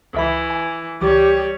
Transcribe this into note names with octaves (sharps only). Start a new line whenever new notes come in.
C#2 E3 E5 B5
G#5
C#2 E3 G3 G4 C#5 D6